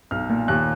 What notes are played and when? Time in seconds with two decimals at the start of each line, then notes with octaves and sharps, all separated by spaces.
0.11 B1 F6
0.29 A#2
0.48 D#2 F#6